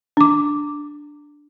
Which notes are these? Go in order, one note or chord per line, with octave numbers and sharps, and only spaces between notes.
D4 D6